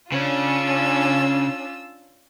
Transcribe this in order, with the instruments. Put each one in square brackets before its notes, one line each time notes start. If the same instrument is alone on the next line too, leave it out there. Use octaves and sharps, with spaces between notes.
[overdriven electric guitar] C#3 [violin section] C#4 D4 [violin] F4 E6